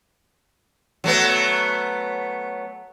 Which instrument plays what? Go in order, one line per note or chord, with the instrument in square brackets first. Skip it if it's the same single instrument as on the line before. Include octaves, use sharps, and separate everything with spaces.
[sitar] F#3 A3 B3